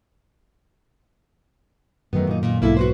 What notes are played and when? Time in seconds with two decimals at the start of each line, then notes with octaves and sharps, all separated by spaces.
2.13 F#2 D#3 A3 B3
2.27 A#2 D#4
2.43 A#2 D#4
2.62 B1 G#2 A#3 E4 A4
2.77 F#4 B4 C5